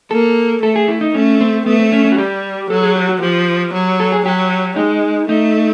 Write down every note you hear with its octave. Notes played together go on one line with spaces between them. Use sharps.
A#3 A4
A3 A4
G#4
E4
D#4
A3 C#4
C4
A3 B3
C4
C#4
C#4
F#4
G3 G4
F#3 A4
G#4
G4
F#4
F3 G4
F#3
A4
G#4
F#3 G4
G#3 D#4
A3 D#4